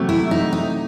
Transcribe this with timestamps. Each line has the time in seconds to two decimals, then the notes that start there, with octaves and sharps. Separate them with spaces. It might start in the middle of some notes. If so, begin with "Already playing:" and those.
Already playing: C3 F#3 A3
0.09 E4
0.31 D#4
0.53 D#4